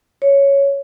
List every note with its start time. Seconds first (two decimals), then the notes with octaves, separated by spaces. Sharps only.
0.22 C#5